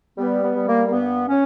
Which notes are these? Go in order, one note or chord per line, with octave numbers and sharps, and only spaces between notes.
G3 B3
B3
G3
A#3
A#3
G2 B3
C#4